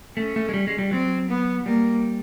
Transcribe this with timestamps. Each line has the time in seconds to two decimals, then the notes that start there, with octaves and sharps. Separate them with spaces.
0.17 A3 C#4
0.36 A3
0.49 G#3
0.54 G3
0.67 G#3
0.79 G3
0.91 F#3 C4
1.29 B3
1.66 G3 A#3